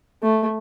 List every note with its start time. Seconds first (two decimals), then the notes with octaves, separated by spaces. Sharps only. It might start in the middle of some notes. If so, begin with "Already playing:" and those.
0.23 A3